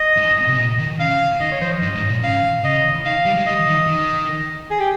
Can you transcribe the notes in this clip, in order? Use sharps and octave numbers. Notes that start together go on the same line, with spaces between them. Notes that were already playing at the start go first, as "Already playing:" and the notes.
Already playing: D#5
G#2
C3
A#2
D#3
C#3 F5
D#3 D#5
C#5
F3 C5
D#5
G2
G#2
A#2
C#3 F5
C#3 D#5
D#3 F5
G3
G#3
G3 D#5
D#3
D#3
G#4
G4